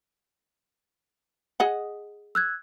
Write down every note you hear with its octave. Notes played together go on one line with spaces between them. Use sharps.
G#4 D#5 F#5
E6 F#6 G#6